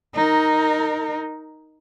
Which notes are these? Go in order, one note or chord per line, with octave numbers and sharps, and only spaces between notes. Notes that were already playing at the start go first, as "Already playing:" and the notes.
D#4 A#4